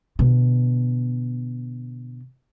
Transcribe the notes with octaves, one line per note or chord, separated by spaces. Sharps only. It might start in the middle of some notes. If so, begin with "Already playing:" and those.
B2 D3